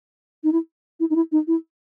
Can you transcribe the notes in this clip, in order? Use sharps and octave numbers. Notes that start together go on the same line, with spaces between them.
D#4
E4
E4
D#4
E4
D#4
E4